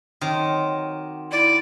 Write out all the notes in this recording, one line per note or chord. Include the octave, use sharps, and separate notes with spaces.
D#3 F#3 C4 G4
E4 D5